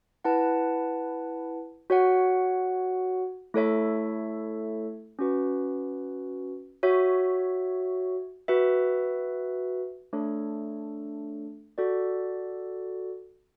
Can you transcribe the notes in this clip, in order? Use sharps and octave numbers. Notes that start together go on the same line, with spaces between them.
E4 B4 F#5 A5
F#4 C#5 F#5
A3 E4 A4 C#5 E5
C#4 F#4 B4
F#4 C#5 E5
F#4 B4 E5
A3 D4 A4 C#5
F#4 A4 D5